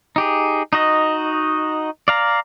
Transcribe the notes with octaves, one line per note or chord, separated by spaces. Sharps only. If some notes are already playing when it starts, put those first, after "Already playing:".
D#4 G4 G#4
D#4 F#4 D#5
D5 F5 A#5